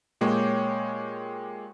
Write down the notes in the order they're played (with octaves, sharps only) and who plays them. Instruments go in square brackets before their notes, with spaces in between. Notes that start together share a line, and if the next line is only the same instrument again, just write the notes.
[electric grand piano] A#2 G#3 A#3 [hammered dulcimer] G4 C#5 G5